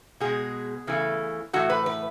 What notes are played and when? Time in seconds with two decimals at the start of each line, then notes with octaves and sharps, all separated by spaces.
0.20 B2 G#3 G#4
0.87 C#3 E3 A3
1.53 A2 E3 A3 F#4
1.70 B4
1.86 B4